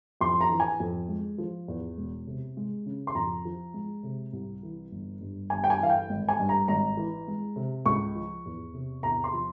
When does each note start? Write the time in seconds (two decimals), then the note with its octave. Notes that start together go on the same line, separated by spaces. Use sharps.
0.21 F2 C6
0.41 A#5
0.50 E3
0.60 G#5
0.80 F2
1.09 G#3
1.38 F3
1.68 E2
1.98 E1
2.27 C3
2.57 G#3
2.86 C#3
3.07 C6
3.15 F2 A#5
3.45 F3
3.74 G#3
4.03 C3
4.33 C2
4.63 E3
4.91 G1
5.21 G2
5.50 G1 G#5
5.64 G5
5.70 G#5
5.79 E3 F5
5.90 G5
6.09 G#1
6.29 G#5
6.39 G2
6.49 A#5
6.68 G#1 A#5
6.97 E3
7.28 G#3
7.56 C3
7.85 C#2 C#6
8.15 F3
8.45 E2
8.74 C3
9.03 E2 A#5
9.24 C6
9.33 F3